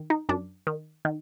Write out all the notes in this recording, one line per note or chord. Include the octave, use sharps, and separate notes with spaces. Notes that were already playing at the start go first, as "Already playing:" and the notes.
Already playing: D#3
D#4
F#2 D4
D#3
D#3